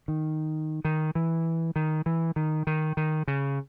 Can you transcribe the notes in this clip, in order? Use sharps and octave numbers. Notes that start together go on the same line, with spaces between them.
D#3
D#3
E3
D#3
E3
D#3
D#3
D#3
C#3